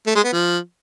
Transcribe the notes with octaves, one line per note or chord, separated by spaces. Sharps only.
A3
G#3
B3
F3